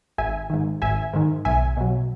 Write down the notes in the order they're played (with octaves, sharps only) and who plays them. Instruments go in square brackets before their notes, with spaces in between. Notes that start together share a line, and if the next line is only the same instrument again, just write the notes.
[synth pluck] G#1 E5 G#5
G#2 D#3
G#1 E5 G#5
G#2 D#3
B1 E5 G#5
B2 F#3